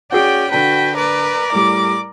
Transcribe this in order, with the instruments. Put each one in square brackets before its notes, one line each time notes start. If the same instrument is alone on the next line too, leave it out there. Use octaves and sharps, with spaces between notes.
[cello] C#4 D5 [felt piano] F#4 G#4 [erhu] G5
[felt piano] D3 D4 [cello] F#4 B4 [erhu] G5
[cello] A#4 D5 [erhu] B4
[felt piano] A2 G3 [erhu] D6